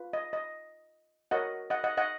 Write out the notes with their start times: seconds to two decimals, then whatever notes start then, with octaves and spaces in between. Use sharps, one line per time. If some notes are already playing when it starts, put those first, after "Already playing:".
Already playing: F4 B4
0.13 D#5
0.33 D#5
1.31 F#4 A#4 C#5 D#5 F#5
1.70 D#5 F#5
1.84 D#5 F#5
1.97 D#5 F#5